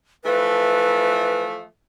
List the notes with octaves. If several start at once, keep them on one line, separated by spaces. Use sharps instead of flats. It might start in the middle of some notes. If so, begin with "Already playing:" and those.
E3 F3 A3 B4